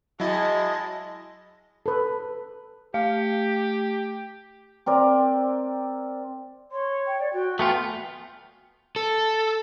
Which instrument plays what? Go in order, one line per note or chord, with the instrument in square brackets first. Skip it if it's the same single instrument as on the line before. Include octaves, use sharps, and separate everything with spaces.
[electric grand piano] F#3 E4 [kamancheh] G#3 A5 [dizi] D#5
[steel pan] A4 B4
[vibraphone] A3 [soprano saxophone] G4 [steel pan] F5
[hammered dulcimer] C4 A#4 D5
[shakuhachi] C#5 [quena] C6
[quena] G5
D5
[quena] F#4 [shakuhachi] G5
[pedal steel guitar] A3 B3 F4 [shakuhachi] G5 [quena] G#5
[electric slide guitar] A4